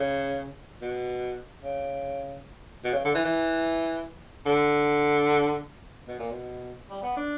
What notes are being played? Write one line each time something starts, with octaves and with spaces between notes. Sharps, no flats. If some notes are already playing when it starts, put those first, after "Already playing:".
Already playing: C#3
B2
C#3
B2
C#3
D3
E3
E3
D3
B2
A#2
B2
G3
B3
D4